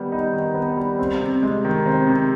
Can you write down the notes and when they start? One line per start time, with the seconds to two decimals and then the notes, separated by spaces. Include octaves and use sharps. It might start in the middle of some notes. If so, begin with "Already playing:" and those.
Already playing: D#3 G3 B3
0.12 D#4
0.33 D#3
0.55 B3
0.77 G3
0.99 C4
1.21 C3
1.43 G#3
1.65 D#3
1.86 C4
2.07 C3